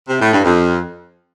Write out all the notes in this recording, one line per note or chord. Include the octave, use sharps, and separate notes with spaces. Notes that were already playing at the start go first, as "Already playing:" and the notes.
C3
A2
G2
F2